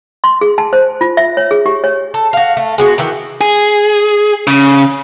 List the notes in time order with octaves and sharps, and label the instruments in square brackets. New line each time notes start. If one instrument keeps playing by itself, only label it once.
[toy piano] C6
G#4
A5
C5
F4
E5
C#5
G#4
G4
C#5
[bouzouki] A4
F#4 F5
A3
G#3 B3 F#4
D#3 E3 B3
[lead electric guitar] G#4
C#3